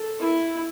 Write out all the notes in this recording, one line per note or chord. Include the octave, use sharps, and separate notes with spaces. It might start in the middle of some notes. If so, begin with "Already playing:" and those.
Already playing: A4
E4